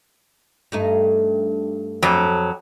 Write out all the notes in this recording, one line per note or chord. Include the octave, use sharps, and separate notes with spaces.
G2 A3 D#4
F2 F#3